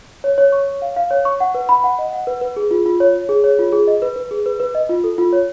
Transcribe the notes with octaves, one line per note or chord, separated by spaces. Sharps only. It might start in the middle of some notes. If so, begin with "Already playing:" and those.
C#5
C#5
C#6
C#5
F5
F5
C#5
C#6
F#5
B4
B5
F#5
D#5
F#5
B4
B4
G#4
F4
F4
C#5
C#5
G#4
C#5
F4
G#4
D#5
B4
B4
G#4
B4
B4
D#5
F4
A4
F4
C#5